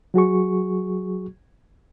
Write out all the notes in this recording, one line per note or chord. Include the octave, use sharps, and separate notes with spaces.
F#3 F#4 G#4 C#6